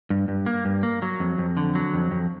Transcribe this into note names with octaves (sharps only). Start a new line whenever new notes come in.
G2
G2
A#3
G2
A#3
F#3
F2
F2
D3
F#3
F2
F2